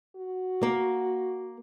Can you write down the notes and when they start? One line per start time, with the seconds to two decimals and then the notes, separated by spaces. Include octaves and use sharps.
0.16 F#4
0.63 A#3